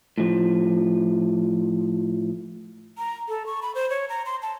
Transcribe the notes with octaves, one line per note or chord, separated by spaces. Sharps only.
A2 F3
A#5
A4
C#6
B5
C5
C#5
A#5
C6
A5